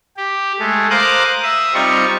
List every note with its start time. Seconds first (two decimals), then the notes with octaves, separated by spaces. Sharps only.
0.17 G4
0.59 G#3 A3
0.90 A#4 C5 F5 D6 D#6 F#6
1.43 E5 D#6
1.74 G3 C4 D#4 F4 C#6